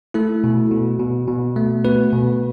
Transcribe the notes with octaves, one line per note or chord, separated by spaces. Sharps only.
A3 E4 A4
B2
B2
B2
B2
A3
B3 F#4 B4
B2